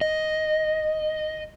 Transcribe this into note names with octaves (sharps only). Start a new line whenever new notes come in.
D#5